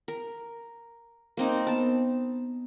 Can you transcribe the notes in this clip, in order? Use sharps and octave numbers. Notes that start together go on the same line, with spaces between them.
A#4
A#3 C4 D#4
B3 A5